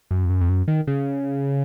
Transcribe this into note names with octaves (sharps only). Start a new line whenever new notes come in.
F#2
F2
F#2
F2
F#2
D#3
C#3